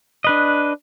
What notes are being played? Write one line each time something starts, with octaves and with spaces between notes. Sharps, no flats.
D4 B4 D#5